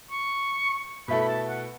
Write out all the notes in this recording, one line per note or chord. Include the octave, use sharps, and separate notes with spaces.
C#6
B2 A3 E4 A4 B5
B5
A5
F#5